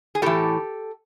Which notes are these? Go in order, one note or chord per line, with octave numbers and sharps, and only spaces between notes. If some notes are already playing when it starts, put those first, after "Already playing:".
G#4
A2 E3 G4 A4